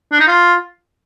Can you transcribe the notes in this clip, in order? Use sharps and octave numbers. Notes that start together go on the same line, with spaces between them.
D4
D#4
F4